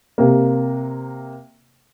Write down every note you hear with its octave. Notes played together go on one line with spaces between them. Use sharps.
C3 A#3